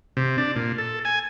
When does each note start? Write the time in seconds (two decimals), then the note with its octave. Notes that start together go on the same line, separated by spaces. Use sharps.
0.17 C3
0.38 D4
0.56 A#2
0.78 A4
1.05 G#5